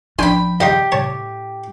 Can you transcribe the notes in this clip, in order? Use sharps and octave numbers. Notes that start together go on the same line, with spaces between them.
A1 F3 D4 G5 B5 C6
A#1 G4 D#5 C6
A2 C#5 A5